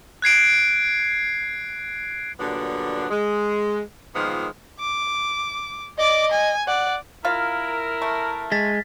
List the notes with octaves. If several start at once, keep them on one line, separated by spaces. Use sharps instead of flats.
F#6 G#6 C7 D7
A#2 D3 F#3 G3 B3 D4
G#3
A#2 D#3 F3 G#3 A#3 B3
D6
D5 D#5 D6
G#5
D5 F#5
E4 F4 A#4 F5 F6
A3
G#3 A6 B6